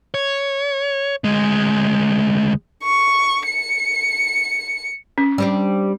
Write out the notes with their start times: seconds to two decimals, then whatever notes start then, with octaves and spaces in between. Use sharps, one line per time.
0.14 C#5
1.24 D2 G#3
2.83 C#6
3.47 C#7
5.18 C#4
5.38 G3 C4 D4